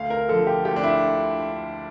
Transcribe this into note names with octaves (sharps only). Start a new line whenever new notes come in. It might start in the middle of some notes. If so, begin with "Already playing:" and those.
Already playing: D2 F5
A#4
D3 F3 A4
G4
D2 G4
D4
E4